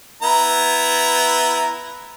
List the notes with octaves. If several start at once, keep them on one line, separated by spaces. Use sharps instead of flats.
B3 E4 A#5